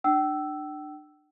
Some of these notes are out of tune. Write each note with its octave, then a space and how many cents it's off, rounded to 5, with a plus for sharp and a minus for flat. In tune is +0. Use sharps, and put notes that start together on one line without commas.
D4 +30 G5 -40 E6 +0